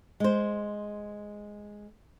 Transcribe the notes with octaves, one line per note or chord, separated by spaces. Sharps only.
G#3 C5